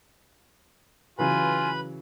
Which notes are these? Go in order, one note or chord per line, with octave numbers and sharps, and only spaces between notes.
C#3 E3 F#3 F4 B4 G#5 B5